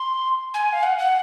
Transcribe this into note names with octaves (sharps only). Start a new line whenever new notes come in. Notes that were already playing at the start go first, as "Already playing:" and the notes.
Already playing: C6
G#5
F5
F#5
F#5